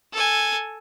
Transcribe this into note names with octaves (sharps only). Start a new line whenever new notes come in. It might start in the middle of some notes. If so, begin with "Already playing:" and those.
A4 G#5